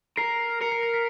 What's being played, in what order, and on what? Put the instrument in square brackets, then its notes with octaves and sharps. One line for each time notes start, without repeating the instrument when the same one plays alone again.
[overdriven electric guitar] A#4 [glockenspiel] C7
[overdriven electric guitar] A#4 [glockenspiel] C#7
[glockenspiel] C7
C7
B6